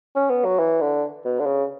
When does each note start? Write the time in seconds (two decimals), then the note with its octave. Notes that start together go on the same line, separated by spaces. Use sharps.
0.16 C#4
0.30 B3
0.45 F#3
0.59 E3
0.81 D3
1.25 B2
1.39 D3
1.46 C#3